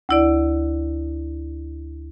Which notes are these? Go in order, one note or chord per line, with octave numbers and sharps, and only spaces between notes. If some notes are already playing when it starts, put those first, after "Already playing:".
D2 E4 D5